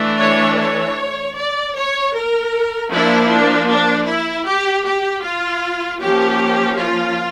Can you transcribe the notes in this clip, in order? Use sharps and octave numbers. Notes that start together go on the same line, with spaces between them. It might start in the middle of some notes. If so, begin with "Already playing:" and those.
Already playing: E3 A3 D4
C#5
C#5
D5
C#5
A#4
F3 A#3 D4 E4
D4
D4
E4
G4
G4
F4
F3 A#3 C#4 G4
F4